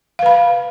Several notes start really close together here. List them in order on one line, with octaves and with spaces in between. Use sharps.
F5 B4 B5